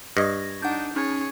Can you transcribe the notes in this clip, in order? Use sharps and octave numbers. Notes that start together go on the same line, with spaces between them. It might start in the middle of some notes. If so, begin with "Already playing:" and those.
G2 D#5 C#6 G#6 A#6
D4 D#4 F#5 G6
C#4 D#4 G#4 C#5